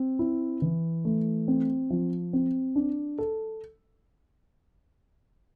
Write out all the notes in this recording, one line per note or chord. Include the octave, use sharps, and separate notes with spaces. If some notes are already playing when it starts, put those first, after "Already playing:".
Already playing: C4
E4
E3
A3
C4
F3
C4
D4
A4